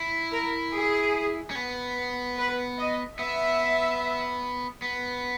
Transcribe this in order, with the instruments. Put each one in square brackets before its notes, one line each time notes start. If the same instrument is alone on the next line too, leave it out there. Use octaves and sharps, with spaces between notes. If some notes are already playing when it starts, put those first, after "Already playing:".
Already playing: [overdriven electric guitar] E4
[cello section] A#4
G#4
[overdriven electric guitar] C#4
B3
[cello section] B4
D#5
[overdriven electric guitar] B3 [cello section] E5
[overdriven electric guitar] B3